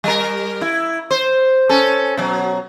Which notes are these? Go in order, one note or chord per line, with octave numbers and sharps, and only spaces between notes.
G3 A#4
E4
C5
C#4 A4
B2 F#3